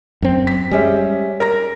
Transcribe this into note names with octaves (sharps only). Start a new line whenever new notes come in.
F#2 C4
B6
G3 G#3 C#4 E5
A#4 A#5 A#6